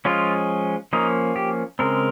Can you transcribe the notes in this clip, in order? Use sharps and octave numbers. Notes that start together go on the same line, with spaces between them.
F3 G#3 C#4 F4
F3 A#3 C#4 D#4
G4
C#3 G#3 C4 A#4